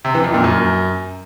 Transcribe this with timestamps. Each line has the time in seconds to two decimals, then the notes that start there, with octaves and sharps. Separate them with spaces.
0.05 C3
0.14 E3
0.24 F2
0.34 A#2
0.44 F#2